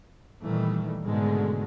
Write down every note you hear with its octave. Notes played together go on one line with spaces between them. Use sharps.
A#2 D#3 E3 G3 A3
G#2 B2 D3 D#3 G#3 A3